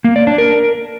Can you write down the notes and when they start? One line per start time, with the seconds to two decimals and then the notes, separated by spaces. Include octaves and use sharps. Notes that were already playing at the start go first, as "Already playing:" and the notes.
0.04 A#3
0.16 D5
0.27 D4
0.38 A#4